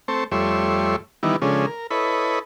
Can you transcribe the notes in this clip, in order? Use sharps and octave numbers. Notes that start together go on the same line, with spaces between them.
A3 C4 C5 A5 C#6
F2 G3 A3 C#5 E5 C6
D#3 E3 G3 B3 D#4 E4
C#3 F3 G#3 C#4 D4 A4
A#4
E4 A4 B4 C#5 D#5 B5